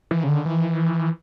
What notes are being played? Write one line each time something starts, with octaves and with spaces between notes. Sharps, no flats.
E3
C#3
D3
E3